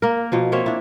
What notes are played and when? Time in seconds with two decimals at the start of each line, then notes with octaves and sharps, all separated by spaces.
0.02 A#3 A#4
0.32 B2 F3 D#4
0.52 A#3 C4 C#5 E5
0.66 D4 E4